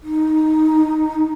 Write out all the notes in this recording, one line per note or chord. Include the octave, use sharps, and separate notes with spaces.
D#4